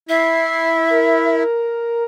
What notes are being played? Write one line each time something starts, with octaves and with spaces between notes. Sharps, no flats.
E4 E5 C7
A#4